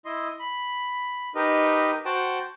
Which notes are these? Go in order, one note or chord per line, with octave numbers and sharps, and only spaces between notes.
E4 D#5 C6
B5
D#4 G4 A#4 B4 D#5
F#4 C5 F#5 G5 A5